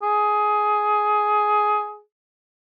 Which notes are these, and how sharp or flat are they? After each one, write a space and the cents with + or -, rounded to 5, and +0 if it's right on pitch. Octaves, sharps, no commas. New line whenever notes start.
G#4 +15